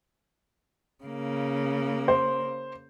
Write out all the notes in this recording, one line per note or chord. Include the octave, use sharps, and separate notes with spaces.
C#3 A#3
C5